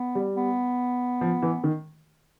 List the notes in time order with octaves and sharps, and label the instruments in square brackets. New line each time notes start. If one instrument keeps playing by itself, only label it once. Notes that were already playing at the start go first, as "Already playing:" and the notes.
Already playing: [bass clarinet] B3
[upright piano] G3
[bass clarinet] B3
[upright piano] F3
E3
D#3